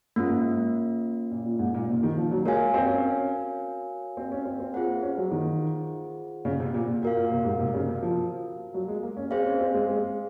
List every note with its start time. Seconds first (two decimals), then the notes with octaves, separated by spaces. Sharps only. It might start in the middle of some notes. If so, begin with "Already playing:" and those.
0.16 G#2 A#3 C#4 F4
1.31 A#2
1.45 A#2
1.59 G#2
1.74 A#2
1.89 C3
2.03 D#3
2.17 F3
2.31 F#3
2.45 G#3 F#4 A#4 C#5 F5 G#5
2.74 C4
2.88 C#4
4.17 C4
4.32 C#4
4.45 C4
4.60 C4
4.74 A#3 F4 G#4 C5 F#5
5.03 C#4
5.17 F#3
5.32 D#3
6.45 C#3
6.60 C3
6.74 A#2
7.03 A#2 F#4 A#4 F5
7.17 A#2
7.31 C3
7.45 G#2
7.60 C3
7.74 C#3
7.88 C3
8.03 F3
8.74 F#3
8.88 G#3
9.03 A#3
9.17 C#4
9.31 C4 G#4 C5 F5
9.46 C#4
9.59 C4
9.74 G#3
9.88 G#3